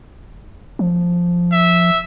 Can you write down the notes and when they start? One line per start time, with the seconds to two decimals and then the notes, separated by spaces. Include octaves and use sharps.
0.79 F3
1.52 E5